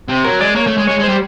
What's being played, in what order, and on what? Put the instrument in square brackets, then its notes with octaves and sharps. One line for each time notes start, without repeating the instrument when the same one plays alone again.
[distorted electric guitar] C3
[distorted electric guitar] F#3 [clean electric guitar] A#4
[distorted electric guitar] G#3 [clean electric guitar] D5
[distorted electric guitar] A#3 [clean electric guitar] C#5
[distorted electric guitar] A3
G#3
[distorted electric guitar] G#3 [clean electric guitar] C#5
[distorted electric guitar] G#3
[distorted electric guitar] G3 [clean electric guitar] C5